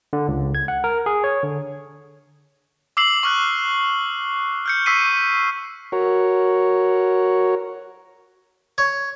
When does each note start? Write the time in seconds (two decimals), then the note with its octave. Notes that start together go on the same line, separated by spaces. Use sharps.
0.13 D3
0.28 C#2
0.55 G#6
0.68 F#5
0.84 A#4
1.06 G#4
1.24 C#5
1.43 D3
2.97 D6 E6 C7 F#7
3.23 C#6 F6 F#6
4.66 F6 G6 C#7
4.86 C#6 E6 B6 C7 D#7
5.92 F#4 A#4 C#5
8.78 C#5